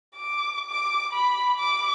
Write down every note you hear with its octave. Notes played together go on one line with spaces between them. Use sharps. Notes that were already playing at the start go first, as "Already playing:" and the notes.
D6
D6
B5
D6